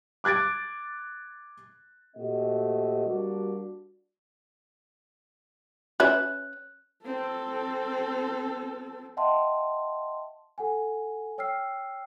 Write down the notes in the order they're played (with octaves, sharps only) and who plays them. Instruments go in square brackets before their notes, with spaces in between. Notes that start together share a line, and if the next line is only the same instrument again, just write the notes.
[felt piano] D6 F#6 G#6 A6 D7
[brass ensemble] A#2 A3 C4 F#4 G4 D#5
G3 A#3 D4 F#4
[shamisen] C#4 B4 E5 [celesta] F#6
[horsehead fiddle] C4 A4
[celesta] D#5 E5 F#5 G5 A5 C6
A4 F#5 G#5
C#5 G5 E6 F6 C7